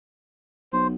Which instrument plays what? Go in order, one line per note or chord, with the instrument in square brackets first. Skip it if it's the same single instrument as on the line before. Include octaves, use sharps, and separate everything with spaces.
[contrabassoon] B1 [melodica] C5